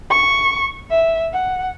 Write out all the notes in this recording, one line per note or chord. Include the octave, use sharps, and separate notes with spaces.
C#6
E5
F#5